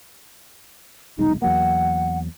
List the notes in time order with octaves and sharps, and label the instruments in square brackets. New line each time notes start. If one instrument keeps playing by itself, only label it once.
[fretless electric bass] D#1 B1 G#3 [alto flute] D#4
[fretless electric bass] E2 F#3 A#3 [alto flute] F#5